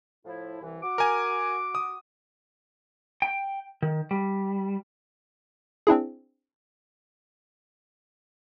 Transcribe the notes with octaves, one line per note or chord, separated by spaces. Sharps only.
A2 F3 E4
C2 E3
F#4 D6
A#4 G#5
D#6
G5
D#3
G3
C4 D4 E4 G#4